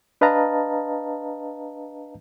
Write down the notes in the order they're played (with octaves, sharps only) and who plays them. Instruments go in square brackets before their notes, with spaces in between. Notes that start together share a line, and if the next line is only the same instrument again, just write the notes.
[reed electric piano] D4 B4 D#5 F5 A5 A#5